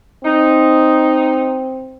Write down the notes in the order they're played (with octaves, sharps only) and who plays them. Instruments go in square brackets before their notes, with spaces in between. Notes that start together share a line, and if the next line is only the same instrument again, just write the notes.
[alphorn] C4 [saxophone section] D#4